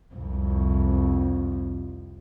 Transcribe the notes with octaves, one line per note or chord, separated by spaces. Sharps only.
C2 F2